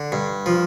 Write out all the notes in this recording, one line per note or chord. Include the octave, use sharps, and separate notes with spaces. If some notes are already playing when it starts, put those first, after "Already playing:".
Already playing: D3
G2
F3